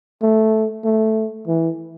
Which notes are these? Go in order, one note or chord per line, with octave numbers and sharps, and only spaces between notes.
A3
A3
E3